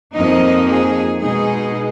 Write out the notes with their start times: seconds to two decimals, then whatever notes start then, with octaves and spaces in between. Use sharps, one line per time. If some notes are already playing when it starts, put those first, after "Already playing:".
0.14 F2 F3 A#3 D#4 D#5
0.68 G#4
1.20 B2 G#3 D#4 G#4